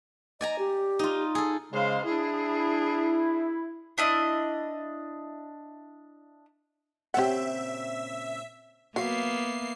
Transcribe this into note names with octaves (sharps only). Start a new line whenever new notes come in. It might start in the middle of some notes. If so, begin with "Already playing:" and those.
D5 D#5 G#5 A#5
G4
D#4 F4
G#4 A4
C#3 G#3 C5 F5
D4 E4 G#4
D4 E4 D#5
A#2 C#3 C4 G4 E5 F#5
F#3 A#3 B3 E5 F5 C7